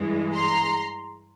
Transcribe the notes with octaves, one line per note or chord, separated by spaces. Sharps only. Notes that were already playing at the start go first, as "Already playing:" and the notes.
Already playing: G2 E3 G#3
A#5 C6